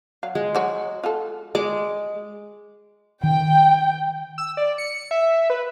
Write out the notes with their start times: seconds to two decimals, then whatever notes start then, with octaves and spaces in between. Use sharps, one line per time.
0.23 F#3 F5
0.35 G#3
0.55 F#3 F#4 C#5
1.04 F4 F#4 A4
1.55 G#3 D#5 D6
3.23 D#3 G5
4.38 E6
4.57 D5
4.78 C#7
5.11 E5
5.50 B4